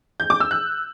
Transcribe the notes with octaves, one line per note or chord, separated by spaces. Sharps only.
G6
D6
E6
F#6